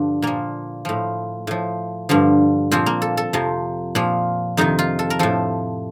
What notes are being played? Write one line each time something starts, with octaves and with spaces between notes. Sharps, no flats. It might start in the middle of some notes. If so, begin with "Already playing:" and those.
Already playing: G2 D3 F3 D4
A#2 F3 A#3
A2 F3
A2 F3
G2 D3 F3
A#2 F3 C4
A#3
A4
A4
F2 C3 F3
A#2 F3
F2 C3 D#3 D#4
F4
A4
A#4
A2 F3 A4